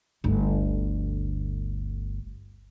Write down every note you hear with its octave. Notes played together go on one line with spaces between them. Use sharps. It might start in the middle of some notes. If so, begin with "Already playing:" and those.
G1 D2